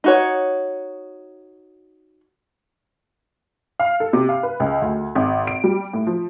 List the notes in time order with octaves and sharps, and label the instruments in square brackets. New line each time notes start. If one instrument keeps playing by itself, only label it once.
[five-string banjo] D#4 F#4 C#5
[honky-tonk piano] F5
A4
C3
F5
B4
C#2
D2
G#1
D7
G3
A2
F3